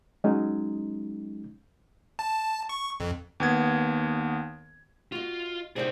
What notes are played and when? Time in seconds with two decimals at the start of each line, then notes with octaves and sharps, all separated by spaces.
0.24 F#3 G#3 C#4 D#4
2.19 A5
2.69 C#6
3.00 F2
3.40 D#2 B3 G#6
5.12 F4 F#4 D#5
5.76 C3 D#4 G#4 C5 D5